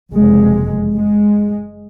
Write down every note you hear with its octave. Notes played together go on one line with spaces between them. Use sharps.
F#1 F2 C3 G#3
G#3